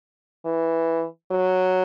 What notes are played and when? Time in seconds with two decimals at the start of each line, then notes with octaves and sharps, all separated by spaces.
0.45 E3
1.31 F#3